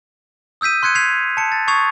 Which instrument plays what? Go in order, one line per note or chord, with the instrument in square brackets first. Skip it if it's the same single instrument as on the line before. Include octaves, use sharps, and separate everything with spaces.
[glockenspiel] D#6 E6 G6 B6 D#7
C6 F#6 G#6 C#7 D#7
G#6 B6 C7 F7
A5 C#7
A6
C#6 D#6 G#6 C7 F7